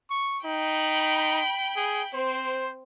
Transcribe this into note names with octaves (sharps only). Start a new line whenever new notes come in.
C#6
D#4 G5 B5
G#4
C4 C5